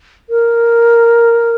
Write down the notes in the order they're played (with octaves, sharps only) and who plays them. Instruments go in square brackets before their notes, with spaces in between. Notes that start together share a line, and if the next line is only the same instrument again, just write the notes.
[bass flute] A#4